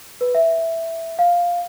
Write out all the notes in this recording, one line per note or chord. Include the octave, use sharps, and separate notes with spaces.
B4
E5
F5